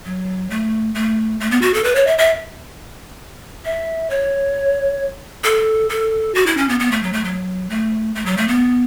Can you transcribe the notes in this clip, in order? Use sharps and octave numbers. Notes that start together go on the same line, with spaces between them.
F#3
A3
A3
A3
B3
F#4
A4
B4
C#5
E5
E5
E5
C#5
A4
A4
F#4
E4
C#4
B3
B3
A3
F#3
A3
F#3
A3
A3
F#3
A3
B3